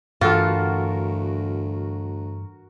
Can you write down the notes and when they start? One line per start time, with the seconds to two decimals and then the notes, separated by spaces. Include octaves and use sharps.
0.21 D2 G2 E3 F4 F#4 A4 A#4